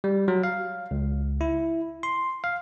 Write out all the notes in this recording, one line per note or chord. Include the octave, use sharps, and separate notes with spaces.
G3
F#3
F5
C#2
E4
C6
F5